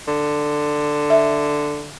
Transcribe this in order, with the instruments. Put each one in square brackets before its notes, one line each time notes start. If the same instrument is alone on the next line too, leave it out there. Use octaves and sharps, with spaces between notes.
[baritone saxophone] D3
[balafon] E5